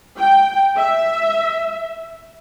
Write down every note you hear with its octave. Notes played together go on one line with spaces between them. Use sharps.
G5
E5